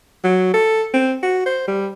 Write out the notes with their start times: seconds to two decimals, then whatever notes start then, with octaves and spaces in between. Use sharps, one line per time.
0.24 F#3
0.54 A4
0.93 C4
1.23 F#4
1.46 C5
1.68 G3